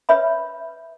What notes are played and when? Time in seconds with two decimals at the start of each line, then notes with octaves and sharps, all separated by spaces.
0.09 B4 C#5 E5 B5